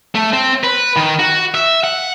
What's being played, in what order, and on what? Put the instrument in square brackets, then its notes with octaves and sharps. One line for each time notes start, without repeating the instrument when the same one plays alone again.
[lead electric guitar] A3
C4
B4
D#3
F#4
E5
F#5